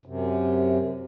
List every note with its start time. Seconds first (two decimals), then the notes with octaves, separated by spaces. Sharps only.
0.05 F#2 C3